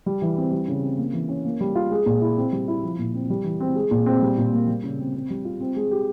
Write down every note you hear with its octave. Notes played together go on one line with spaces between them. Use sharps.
G3
E3
C4
G3
C#3
C4
A#3
E3
C#4
A#3
G3
F4
G#3
A#2
E4
C4
G3
E4
F3
A#2
C4
G3
E3
C4
G#3
A#2
C4
G3
A#2
A#3
G3
C#3
C4
C4
G3
F4
C4
G#3
G4